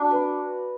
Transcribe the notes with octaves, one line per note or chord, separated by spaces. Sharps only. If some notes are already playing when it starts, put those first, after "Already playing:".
Already playing: D4 F#4
B4